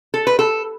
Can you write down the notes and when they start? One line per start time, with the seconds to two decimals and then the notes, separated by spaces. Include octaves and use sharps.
0.14 A4
0.27 B4
0.39 A4